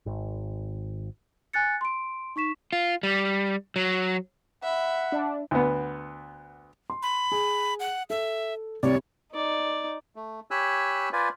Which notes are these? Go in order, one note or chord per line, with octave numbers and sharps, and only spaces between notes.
G#1
G#5 F#6 A6 C#7
C6 D7
D#4 C#6 B6 E7
F4
G3
F#3
E5 F#5 B5
D4
D2 B3
C6
B5
G#4
F#5
A4 E5
C2 C3 G3 C#5 D5
D#4 D5
A3
G4 C#5 G#5 B5 E6 F#6
F4 B4 C5 D5 G#5